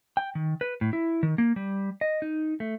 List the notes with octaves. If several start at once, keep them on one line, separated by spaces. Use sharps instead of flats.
G5
D#3
B4
A2
E4
D#3
A#3
G3
D#5
D#4
A3